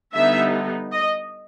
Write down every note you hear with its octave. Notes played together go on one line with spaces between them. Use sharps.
D3 G3 B3 D#4 E5
D#5